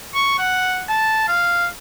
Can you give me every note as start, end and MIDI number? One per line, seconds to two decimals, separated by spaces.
0.14 0.34 85
0.38 0.82 78
0.89 1.23 81
1.28 1.66 77